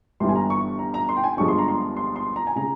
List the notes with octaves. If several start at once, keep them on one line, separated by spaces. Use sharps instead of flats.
G1 G2 E3 G3 C6
G#5
A#5
C#6
A#5
A#5
C6
G5
G#5
G1 G2 F3 G#3 C#6
C6
A#5
C6
C6
C6
A#5
G#5
C#3 A#5